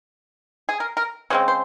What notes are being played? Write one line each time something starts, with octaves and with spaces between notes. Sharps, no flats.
G#4
A#4
A#4
C#3 G#3 C4 C#5
C5